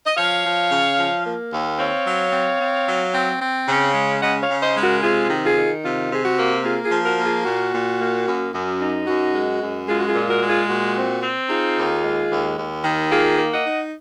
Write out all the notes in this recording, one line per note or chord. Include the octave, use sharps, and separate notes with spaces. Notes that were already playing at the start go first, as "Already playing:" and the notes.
D#5
F3 C#5 F5
F3
C#3
F3
A#3
D#2
C4 C#5 F5
F#3
C4
C4
F#3
C4
C4
C#3
G#3
C#3 D#5 F#5
C#5 F5
C#3
C5 D#5
G#3
F#4 A#4
C3 F4 G#4
D#3
F4 G#4
D#3
C3 F4
C3 G#4
F#4
A#3
A#3 F4 G#4
F4 G#4
F3
F#4 A#4
A#3
F4 G#4
A#2 F#4
A#2
A#3
F#2
F#2
D#4
F#2 F#4
G#3
F#2
G#3 F4 G#4
F#4
F4 G#4
A#2
F#4 A#4
G#3
F4 G#4
A#2 F#4
C4
C4
D#4 F4 G#4
D#2
G#3
D#2
D#2
D#3
A#3 F4 G#4
A#3
D#5 F#5
D#4